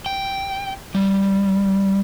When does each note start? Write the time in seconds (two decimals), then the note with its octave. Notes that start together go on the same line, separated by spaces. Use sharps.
0.06 G5
0.95 G3